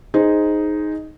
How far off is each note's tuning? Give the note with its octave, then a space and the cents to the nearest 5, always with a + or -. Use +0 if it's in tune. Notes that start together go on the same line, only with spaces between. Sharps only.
D#4 +0 G#4 +5 C5 +0